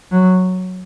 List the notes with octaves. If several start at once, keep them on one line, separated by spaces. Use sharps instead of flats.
F#3